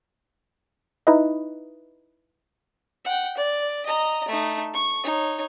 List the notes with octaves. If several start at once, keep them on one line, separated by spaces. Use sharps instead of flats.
D#4 E4 B4 D#5
F#5 G5
D5
D#5 A#5
A3 D#4
C#6
D#4 C#5